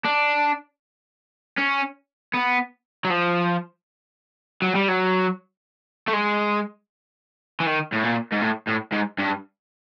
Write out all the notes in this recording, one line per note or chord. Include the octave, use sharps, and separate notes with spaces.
D4
C#4
B3
F#3
F3
F#3
G3
F#3
A3
G#3
E3
D#3
A2
A#2
G#2
A2
A2
G#2
G2